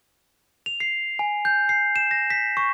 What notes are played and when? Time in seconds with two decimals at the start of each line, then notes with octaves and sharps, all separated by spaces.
0.66 F7
0.80 C7
1.19 G#5
1.45 G6
1.69 C7
1.96 E7
2.11 A#6
2.30 B6
2.57 C#6